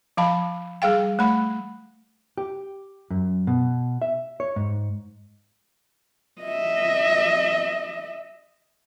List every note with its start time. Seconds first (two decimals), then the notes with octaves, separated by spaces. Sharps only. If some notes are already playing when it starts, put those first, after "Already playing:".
0.17 F3 F5 A5 B5
0.82 G3 G#4 F5 G5
1.19 A3 B5
2.38 G4
3.10 F#2
3.47 B2
4.02 E5
4.40 C#5
4.56 G#2
6.42 D#5 E5